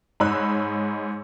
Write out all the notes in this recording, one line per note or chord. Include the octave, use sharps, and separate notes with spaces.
G#2 D#4 C#5 B5 E6 F#6